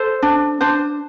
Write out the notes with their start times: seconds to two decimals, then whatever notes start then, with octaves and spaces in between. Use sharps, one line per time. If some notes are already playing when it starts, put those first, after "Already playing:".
Already playing: A4 C5
0.23 D4
0.61 D4 C5